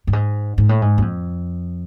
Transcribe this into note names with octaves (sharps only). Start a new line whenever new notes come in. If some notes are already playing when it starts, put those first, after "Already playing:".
G2
G#2
G#2
A2
G#2
F#2
F2